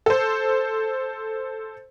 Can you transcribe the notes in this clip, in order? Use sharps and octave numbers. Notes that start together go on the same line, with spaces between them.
A4 C5